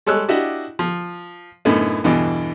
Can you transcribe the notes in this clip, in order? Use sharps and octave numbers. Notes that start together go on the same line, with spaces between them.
G3 G#3 A4 C#5 E6 F#6
D4 E4 F#4 G4 D#5
F3
F#2 A2 D3 A3 B3 D#4
E2 G2 B2 D3 E3